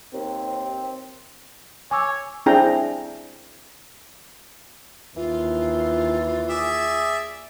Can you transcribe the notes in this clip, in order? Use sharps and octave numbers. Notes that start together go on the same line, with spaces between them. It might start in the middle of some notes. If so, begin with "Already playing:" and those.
D#2 C4
C#5 G#5 D6 E6
C4 D4 E4 G#4 G5 A#5
D#2 E3 F4
G#4 D5 E5